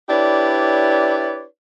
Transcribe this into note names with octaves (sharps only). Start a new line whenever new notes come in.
D4 E4 G4 B4 C#5 D5